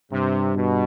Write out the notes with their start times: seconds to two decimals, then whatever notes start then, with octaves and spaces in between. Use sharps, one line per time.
0.12 G2 C3
0.56 B2